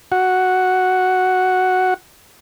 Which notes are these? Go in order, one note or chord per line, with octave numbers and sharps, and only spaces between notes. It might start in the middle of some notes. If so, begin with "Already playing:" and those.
F#4 F#5